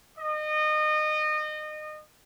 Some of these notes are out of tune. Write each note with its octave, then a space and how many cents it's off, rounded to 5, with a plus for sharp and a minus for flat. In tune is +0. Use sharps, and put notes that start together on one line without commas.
D#5 -30